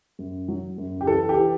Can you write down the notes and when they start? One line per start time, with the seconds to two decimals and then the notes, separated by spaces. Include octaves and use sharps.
0.19 F#2
0.48 F#3
0.78 F#2
1.01 G4
1.07 E3 A4
1.29 G4
1.36 E3